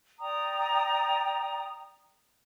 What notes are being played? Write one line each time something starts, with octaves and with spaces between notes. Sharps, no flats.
D5 G5 A#5 D#6